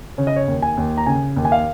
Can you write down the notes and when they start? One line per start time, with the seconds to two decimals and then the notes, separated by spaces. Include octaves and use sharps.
0.18 C#3 C#5
0.27 D#5
0.36 C#5
0.48 D#2
0.62 G#5
0.77 D#2
0.97 A#5
1.07 C#3 G#5
1.37 D#2
1.45 G#5
1.52 F5